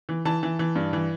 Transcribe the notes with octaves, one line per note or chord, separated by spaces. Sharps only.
E3
E3 A5
E3
E3
G2
E3